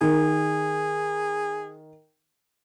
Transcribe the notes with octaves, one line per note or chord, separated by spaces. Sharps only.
D#3 G#4